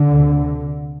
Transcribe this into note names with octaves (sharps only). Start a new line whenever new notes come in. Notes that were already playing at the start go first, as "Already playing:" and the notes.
Already playing: D3
D2 C3